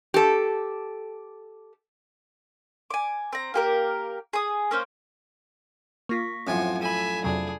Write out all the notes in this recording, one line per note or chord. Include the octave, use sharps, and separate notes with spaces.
G4 A4
G#5 D6
C4 A#5
A#3 G4 A#4
G#4 D#6
A#3 C#4 C5
A#3 F4 C#6 A#6 B6
F#2 A2 F3 A3 C4 C5 F#5 G#5
A4 E5 G#5 B5 D#7
F2 C3 F#3 D4 G#4